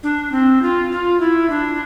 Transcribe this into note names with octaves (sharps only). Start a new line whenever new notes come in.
D4
C4
F4
F4
E4
D4